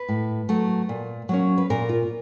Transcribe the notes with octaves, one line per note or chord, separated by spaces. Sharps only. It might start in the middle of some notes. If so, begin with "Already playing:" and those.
Already playing: B4
A2
F#3 A3
A#2
F#3 A#3 C#4
B4
A#2 A#4
F4